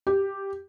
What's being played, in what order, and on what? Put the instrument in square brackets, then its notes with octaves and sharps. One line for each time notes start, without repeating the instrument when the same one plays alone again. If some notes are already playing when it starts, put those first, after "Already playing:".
[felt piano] G4